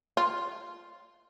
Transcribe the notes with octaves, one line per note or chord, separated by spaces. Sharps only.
F4